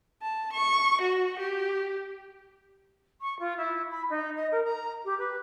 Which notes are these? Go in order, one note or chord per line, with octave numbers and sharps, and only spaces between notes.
A5
C#6
F#4
G4
C#6
F4
E4
B5
D#4
D#5
A#4
A#5
G4
B4